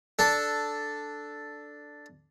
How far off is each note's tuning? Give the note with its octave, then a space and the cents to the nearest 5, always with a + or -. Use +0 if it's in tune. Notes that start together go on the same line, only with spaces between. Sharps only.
D4 +0 A4 +0